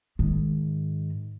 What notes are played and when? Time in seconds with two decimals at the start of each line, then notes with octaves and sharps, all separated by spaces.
0.19 G#2 D#3